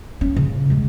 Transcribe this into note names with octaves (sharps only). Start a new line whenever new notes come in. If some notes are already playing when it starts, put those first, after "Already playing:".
C#4
C#3
D3 G#3